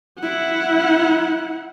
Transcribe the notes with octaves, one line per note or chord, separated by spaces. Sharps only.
E4 F#5